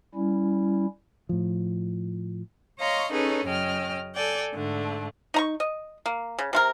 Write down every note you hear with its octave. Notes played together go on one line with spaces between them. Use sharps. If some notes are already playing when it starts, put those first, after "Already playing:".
G3 C#4 E4
A2 F3
C#5 D#5 F5 A#5 C6 C#6
C#4 D#4 G#4 A4 B4 C#5
F#2 C#3 C#4 D#5 G5 F6
A4 D5 G5 G#5
G#2 D3 A3
D#4 A#5 C#6
D#5
A#3
C#3
C3 F4 A#4